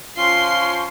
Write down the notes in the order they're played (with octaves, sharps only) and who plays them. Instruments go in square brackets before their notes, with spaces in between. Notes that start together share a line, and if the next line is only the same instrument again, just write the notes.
[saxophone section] F3 C#4 F4 [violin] C6